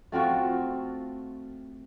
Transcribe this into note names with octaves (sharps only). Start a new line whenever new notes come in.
A3 C4 F4 F#4